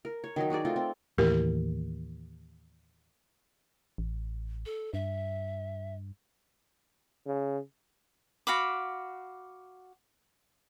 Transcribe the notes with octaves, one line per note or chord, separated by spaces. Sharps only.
A#4
C#5
D#3 F#3 D#4
D#4 F#4 G#4 D5
A3 C4 F4 A4
C4
D#2 A2 E3 G4 A#4
A1
A4
G2 E5
C#3
F#4 F5 B5 D6